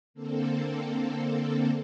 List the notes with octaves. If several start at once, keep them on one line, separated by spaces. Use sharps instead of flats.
D3 A#3 C4 A4